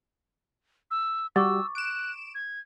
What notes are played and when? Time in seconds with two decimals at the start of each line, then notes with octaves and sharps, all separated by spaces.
0.91 E6
1.36 G3 F#4 G4 C#6 D6 E6 A6
1.75 F#6 D7 E7
2.35 G#6